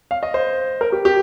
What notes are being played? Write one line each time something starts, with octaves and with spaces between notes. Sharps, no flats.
F5
D#5
C5
A#4
G4
G4